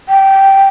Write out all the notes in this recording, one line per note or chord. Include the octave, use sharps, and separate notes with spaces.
G5